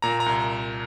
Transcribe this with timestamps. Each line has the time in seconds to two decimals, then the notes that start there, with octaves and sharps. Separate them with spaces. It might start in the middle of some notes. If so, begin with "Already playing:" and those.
0.02 A#2 A#5
0.20 A#5
0.26 C2